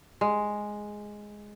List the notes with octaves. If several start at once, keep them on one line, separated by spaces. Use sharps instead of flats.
G#3